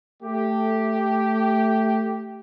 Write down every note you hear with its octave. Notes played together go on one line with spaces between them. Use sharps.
A3 G4